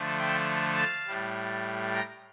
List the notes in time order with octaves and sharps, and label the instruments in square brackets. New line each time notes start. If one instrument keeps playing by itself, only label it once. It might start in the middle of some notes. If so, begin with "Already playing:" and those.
Already playing: [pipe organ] D3 F3 A3
E5 G5
F5 A5
A2 G3
G5 A#5